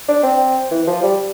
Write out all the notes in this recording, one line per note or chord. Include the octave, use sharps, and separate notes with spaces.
D4
C4
E3
F3
G3